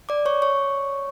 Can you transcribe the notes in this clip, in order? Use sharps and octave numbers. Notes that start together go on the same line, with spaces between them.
D5 D6
C#5 C#6
C#5 C#6